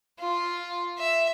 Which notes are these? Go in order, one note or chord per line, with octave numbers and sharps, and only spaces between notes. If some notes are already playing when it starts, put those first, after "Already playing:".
F4
E5